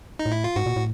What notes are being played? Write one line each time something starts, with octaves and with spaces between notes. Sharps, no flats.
D#4
A2
E4
F4
G#2 F#4
A#2
A2